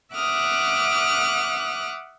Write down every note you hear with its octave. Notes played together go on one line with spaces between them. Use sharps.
E5 F#5 D6 D#6 F6 F#6